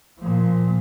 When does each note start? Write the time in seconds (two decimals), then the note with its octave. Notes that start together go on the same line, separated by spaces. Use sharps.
0.19 A#2 F3